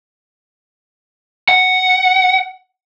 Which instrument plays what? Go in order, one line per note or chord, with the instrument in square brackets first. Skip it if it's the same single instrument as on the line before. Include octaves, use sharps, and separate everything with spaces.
[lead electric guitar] F#5